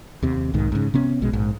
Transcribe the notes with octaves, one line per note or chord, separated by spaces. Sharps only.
D#2 C3
B1 G#2 D#3
G#2 C#3
C3 B3 C#4
A#1 B2 G#3
A#1 G#2